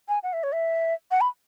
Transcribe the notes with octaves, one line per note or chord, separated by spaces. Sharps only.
G#5
F#5
E5
C#5
E5
F#5
B5